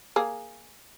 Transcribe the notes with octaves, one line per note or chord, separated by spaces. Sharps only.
A#3 G#4